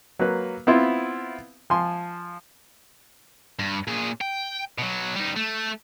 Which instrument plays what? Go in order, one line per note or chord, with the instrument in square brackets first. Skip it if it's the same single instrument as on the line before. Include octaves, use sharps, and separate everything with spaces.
[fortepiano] F#3 A#3 B4
B3 C4 E4 F4
F3 G#5 C6
[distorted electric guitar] G2
A#2 G#4
G5
B2 F#3
G3 D#4
A3